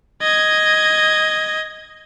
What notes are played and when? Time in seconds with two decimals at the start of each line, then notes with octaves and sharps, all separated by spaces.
0.22 D#5 G#6